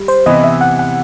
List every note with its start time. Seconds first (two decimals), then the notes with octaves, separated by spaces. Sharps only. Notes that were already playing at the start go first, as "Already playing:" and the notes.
Already playing: G3
0.08 C5
0.26 C3 E3 B3 E4 D#5
0.44 E5
0.61 F#5
0.79 F#5